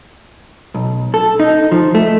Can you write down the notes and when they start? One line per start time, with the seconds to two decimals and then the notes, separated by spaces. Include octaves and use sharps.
0.74 B1
1.14 A4
1.40 D#4
1.72 F3
1.95 A3